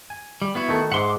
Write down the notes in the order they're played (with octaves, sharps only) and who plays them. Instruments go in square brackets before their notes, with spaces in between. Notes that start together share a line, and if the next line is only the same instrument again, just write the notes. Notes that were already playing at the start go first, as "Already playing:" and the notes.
[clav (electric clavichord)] G#5
[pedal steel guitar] G3
B3 E4 F#4
[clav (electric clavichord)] D#3 A3
[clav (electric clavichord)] G#2 E5 [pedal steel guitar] F#5 C6 D6